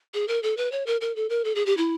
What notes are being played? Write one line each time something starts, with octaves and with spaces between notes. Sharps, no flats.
G#4
A#4
A4
B4
C#5
A#4
A#4
A4
A#4
A4
G#4
G4
E4